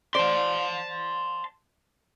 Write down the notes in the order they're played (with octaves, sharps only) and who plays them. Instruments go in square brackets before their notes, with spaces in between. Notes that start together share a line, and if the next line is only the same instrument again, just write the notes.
[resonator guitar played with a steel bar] C5 D5 [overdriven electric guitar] A5 C6